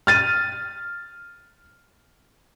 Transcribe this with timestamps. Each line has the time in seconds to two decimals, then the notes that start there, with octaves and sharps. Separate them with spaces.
0.07 F6 A6 D#7